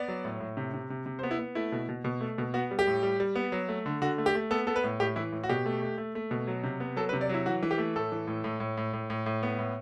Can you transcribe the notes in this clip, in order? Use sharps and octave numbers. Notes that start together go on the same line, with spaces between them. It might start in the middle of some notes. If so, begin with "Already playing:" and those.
Already playing: B3 D5
F#3
A2
A2
C3
C3
C3
C3
C5
B3
E4
B3
A3 E4
B2
B2
B2
A3
B2
B3 F#4
G3
G4
A2
G3
G3
B3
F#3
A3
D3
D3 F#4
A3
G4
A3
B3 A4
B3 A4
B4
A2
A2 G4
E3 E4
A2
F#4
B2 G4
A3
A3
A3
A3
B2
F#3
C3
B3
F#3 A4
B4
C3
D5
F#3 E4
E3 F#4
E3
G4
A3
A2 A4
E3
A2
A2
A2
A2
A2
A2
A2
B3
A2